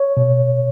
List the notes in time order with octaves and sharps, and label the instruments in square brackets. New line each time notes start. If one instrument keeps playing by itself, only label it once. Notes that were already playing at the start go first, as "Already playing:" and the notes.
Already playing: [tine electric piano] C#5
B2